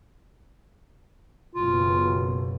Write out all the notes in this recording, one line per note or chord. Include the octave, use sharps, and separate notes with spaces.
F#1 B2 F4